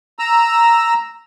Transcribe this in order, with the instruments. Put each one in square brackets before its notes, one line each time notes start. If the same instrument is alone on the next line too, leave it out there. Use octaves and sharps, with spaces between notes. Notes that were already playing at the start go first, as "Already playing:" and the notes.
[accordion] A#5 E6